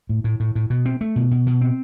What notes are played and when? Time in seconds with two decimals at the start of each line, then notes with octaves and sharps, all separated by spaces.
0.09 A2
0.24 A2
0.40 A2
0.55 A2
0.70 B2
0.86 C4
1.01 A3
1.16 B2
1.31 B2
1.47 B2
1.61 C4